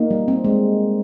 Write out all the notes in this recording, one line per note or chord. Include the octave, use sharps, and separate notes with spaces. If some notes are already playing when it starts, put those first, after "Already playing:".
Already playing: A#3 D#4
G3
C4
G#3